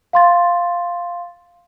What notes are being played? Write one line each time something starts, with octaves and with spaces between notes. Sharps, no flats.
F5 C6 A6